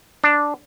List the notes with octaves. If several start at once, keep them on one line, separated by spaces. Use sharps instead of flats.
D4